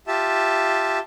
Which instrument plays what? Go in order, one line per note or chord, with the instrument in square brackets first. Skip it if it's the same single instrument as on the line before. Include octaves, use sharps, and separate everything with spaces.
[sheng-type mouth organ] F4 G4 E5 A5